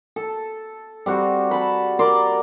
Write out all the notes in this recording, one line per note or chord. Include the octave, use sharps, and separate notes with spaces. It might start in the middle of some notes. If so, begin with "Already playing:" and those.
A4
G3 C4 F#4
A5 B5
A#4 D5 C6